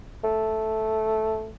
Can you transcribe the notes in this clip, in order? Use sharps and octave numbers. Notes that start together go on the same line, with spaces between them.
A3